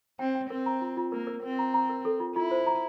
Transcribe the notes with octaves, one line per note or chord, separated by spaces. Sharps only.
C4 G5
G5
C4 A#4
A#5
F4
F4
A#3 A#4
A#4
C4 A#4
A#5
A#5
A#4
A4
F4
E4 F4
C5
A#5